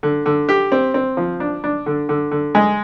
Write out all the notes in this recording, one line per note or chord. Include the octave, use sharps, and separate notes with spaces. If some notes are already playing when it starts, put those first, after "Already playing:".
D3
D3
G4
C4
C4
F3
D4
D4
D3
D3
D3
G#3